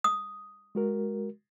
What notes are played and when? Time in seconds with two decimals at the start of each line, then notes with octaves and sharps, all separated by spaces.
0.04 D#6
0.75 G#3 F#4 A#4